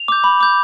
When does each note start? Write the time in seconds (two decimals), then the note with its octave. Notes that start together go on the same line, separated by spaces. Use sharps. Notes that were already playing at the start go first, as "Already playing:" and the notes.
Already playing: F7
0.08 D6 G6
0.24 B5
0.40 D6 G6